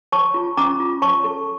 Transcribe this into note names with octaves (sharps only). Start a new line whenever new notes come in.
C#5 A5 C#6
F4
C#4 A#5 D6
F4
C#5 A5 C#6
A4